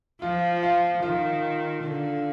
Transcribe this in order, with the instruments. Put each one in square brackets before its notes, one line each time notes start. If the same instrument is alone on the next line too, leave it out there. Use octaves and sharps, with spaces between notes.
[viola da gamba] F3 [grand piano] F4
[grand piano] F4
[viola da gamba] D#3 [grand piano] F4
[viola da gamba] D3